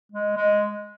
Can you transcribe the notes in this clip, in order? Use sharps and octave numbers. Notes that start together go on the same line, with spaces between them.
G#3
G#3